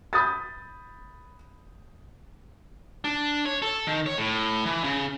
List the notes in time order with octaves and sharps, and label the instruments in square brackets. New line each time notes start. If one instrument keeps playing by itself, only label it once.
[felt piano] B5 D#6 G6 A6
[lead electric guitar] D4
C#5
A4
D#3
C#5
A2
E3
C#3